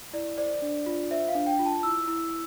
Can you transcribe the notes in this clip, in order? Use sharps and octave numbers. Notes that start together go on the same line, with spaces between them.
E4 D5
C5 D5
D4
F4
C5 E5
F5
D4
G5
F4
A5
E4 E6
E4